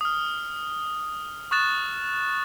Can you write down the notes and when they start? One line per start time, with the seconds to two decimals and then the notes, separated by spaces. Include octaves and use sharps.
0.01 D#6 F6
1.51 C#6 D#6 F#6 A6 E7